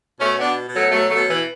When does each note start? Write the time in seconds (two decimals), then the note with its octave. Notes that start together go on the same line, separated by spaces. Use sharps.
0.19 B2 A3 C#4
0.37 B3 D4
0.43 B2
0.68 B2
0.73 F#3 A3
0.91 B2 F#3 A3
1.10 F#3 A3
1.16 B2
1.28 E3